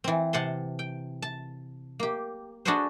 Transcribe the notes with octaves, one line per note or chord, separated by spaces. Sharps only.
E3 C4
C3 F#5 A5 C6
G5
A5
A#3 G4
D4 F#4 G#4 A4 B4 C5